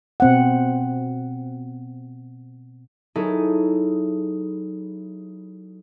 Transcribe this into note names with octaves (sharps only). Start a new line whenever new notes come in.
B2 C4 F#5
F#3 D#4 E4 G#4 A4 D#5